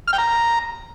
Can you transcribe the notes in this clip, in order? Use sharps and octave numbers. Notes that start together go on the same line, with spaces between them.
F6
G5
A#5